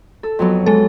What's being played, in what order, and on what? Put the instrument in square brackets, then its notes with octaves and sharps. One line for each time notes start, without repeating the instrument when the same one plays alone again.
[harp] A4
F2 F#3 B3
[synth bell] G#3 A4